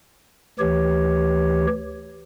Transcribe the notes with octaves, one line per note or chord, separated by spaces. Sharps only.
D2 E3 G4 C#5